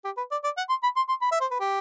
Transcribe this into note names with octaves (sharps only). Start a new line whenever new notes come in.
G4
B4
D5
D5
F#5
C6
B5
C6
C6
B5
E5
C5
B4
G4